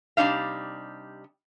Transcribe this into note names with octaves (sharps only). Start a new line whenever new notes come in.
C3 G3 D4 D#4 F5